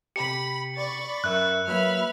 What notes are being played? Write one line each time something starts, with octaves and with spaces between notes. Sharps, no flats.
C3 G4 B5 C#7
D5 B5 C#6 A6
F#2 A#4 E5 F#6
F#3 A#3 B4 E5 B5 F6